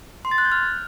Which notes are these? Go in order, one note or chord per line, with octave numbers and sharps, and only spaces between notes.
C6
A6
F#6
G6
F6